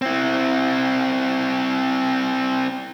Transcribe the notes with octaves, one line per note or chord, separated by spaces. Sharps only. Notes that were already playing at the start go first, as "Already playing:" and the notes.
C4 E4